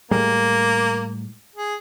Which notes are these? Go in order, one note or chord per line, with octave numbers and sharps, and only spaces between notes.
A2 G3 G#3 A#3
G#4